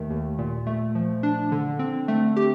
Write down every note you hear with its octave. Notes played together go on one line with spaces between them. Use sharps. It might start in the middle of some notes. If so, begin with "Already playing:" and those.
Already playing: D#2 D#3 A3
D#2
A#2
A3
F3
D4
D3
C4
A3
G4